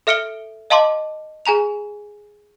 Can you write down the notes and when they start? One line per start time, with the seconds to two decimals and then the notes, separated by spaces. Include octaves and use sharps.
0.07 A4 E5 F6 C#7 D7 G7
0.70 D#5 F5 A5 C6 D6
1.46 G#4 G#5 A#5 F7